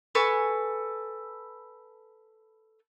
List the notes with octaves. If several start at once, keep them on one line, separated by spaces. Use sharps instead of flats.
A4 B4 G#5 C#6